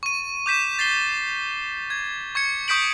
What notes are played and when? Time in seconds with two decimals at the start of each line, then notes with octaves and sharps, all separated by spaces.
0.03 C#6 D#7
0.46 D6 G6 B6 E7
0.79 A6 C7 G7
1.90 G#6
2.35 C#6 G#6 C#7
2.68 C#6 D#6 G6 B6 D7 F#7